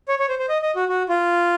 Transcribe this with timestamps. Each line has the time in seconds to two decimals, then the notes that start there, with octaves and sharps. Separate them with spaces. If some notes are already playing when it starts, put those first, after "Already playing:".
0.08 C#5
0.19 C#5
0.29 C5
0.39 C5
0.49 D#5
0.62 D#5
0.76 F#4
0.89 F#4
1.09 F4